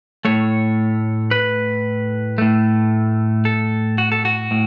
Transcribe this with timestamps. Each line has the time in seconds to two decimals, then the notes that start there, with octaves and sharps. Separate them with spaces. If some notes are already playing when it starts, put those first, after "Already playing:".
0.25 A2 A3 C#5
1.31 B4
2.38 A2 A3
3.45 A4
3.98 F#4
4.12 A4
4.25 F#4
4.51 A2